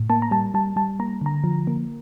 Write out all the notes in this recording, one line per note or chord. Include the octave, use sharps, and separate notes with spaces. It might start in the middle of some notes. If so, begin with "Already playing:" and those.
Already playing: A2
A#3 A5
A#5
G3 A5
G3 A5
G3 A5
A#3 A#5
D3 A#5
F3
A#3